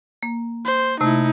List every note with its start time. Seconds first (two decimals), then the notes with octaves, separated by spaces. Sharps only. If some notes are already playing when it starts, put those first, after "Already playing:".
0.23 A#3
0.65 C5
1.01 C3 A3 D#4 E4